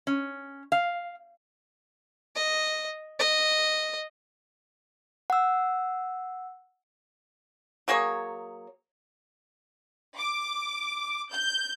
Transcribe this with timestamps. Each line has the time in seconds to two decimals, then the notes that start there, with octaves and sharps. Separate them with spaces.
0.07 C#4
0.72 F5
2.36 D#5
3.19 D#5
5.30 F#5 E6
7.88 F#3 A#3 G#4 C#5
10.17 D6
11.31 G6